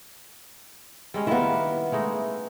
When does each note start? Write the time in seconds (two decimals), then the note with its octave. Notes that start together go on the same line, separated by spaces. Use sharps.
1.14 G3 G#3 C#4
1.27 D#3 A#3 B3 E4
1.92 G#3 A3 D#4